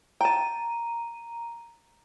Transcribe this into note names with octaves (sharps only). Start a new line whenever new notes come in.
G5 A5 A#5 D#7